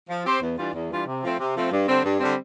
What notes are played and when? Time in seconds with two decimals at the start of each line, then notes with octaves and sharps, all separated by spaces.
0.09 F3
0.25 C4 G4 C5
0.41 E2
0.58 E3 G3 D4 F4
0.74 E2
0.90 E3 G3 D4 F4
1.07 C3
1.23 F3 A3 C4
1.39 C3
1.55 F3 A3 C4
1.72 G2
1.87 D3 G3 C4
2.04 G2
2.20 D3 G3 C4